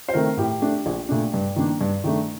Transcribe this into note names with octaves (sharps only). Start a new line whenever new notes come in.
C5
D#3 A3 C4 A#4
A2 G4
A3 D4
A#1
A#2 A3 D4
G2
D#3 A#3 D4
G2
D#3 A3 D4